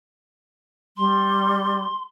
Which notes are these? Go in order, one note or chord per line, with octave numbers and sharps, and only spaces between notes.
G3 C6